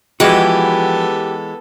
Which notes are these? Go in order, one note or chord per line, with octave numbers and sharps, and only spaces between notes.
E3 F3 G#3 B3 E4 F#4 G4 A4